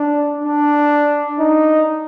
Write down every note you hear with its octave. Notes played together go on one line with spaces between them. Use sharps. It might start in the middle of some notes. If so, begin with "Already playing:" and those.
Already playing: D4
D4
D#4